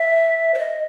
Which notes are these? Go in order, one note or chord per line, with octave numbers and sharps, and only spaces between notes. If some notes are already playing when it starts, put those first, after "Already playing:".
Already playing: E5
C5
D#5